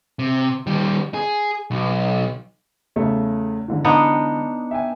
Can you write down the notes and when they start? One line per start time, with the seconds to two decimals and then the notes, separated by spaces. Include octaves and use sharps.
0.19 C3
0.67 D#3 G3
1.14 G#4
1.71 B1
2.96 E2 C#3 A3
3.68 G#2 D3 E3
3.85 B3 D4 D#4
4.71 E5 G5 G#5